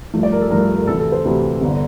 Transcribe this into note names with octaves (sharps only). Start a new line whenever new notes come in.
G2 F3 A3
D5
A#4
A4
G2 F3 A3 A#4
A4
A#4
D2 C3 E3 A4
A4
C5
D2 C3 E3
G1 D3